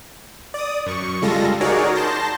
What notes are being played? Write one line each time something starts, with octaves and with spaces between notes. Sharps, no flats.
D5 D#6
F#2 C#6
C#3 G3 G#3 F4 A4 A#6
D#4 F#4 G#4 A#4 C#5 D5
A5 C6 G6 A#6